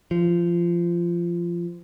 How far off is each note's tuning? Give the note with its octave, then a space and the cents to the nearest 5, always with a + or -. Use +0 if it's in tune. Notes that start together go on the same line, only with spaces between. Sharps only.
F3 -20